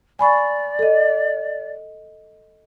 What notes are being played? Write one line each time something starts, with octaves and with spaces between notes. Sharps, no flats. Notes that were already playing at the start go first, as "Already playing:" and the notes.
D5 G#5 B5 C#6
A4 D#5